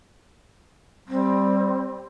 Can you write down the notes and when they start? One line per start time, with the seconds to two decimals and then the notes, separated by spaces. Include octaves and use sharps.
1.09 G3 C4